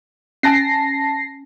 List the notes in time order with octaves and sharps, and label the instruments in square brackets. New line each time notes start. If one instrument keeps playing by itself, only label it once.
[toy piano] C#4 G#5 [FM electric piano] A5 A#6 C7